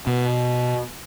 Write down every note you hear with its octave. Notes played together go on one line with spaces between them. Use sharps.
B2